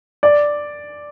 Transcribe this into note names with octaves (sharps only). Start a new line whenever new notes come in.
D5